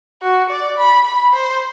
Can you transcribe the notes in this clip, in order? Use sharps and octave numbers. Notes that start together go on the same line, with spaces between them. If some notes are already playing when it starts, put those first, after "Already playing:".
F#4
D5
B5
B5
C5